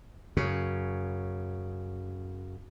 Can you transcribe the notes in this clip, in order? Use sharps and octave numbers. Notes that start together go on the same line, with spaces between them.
F#2 C#3